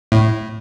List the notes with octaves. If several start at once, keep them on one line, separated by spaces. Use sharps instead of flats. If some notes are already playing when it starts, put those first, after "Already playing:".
A2